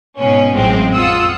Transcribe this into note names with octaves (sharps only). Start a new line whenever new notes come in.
G#2 B2 C#4
A1 F#2 F3 G#3 C4
F2 F4 F#5 D#6 E6